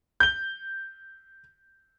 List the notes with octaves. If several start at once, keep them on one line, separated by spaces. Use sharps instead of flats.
G6 G7